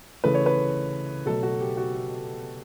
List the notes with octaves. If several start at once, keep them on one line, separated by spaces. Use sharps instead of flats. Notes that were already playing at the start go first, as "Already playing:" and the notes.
C#3 E3 A3 B4
C#5
B4
B2 F#3 A3 A4
F#4
G4
F#4